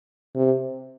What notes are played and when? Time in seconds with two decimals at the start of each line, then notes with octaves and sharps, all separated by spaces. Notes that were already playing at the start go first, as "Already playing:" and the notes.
0.36 C3